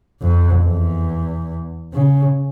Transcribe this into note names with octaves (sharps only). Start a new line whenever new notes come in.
F2
E2
C#3